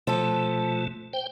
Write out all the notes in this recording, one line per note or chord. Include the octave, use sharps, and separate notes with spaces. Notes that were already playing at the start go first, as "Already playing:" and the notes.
B2 F3 A3 A4
C5 G5